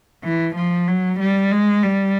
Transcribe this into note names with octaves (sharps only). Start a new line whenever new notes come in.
E3
F3
F#3
G3
G#3
G3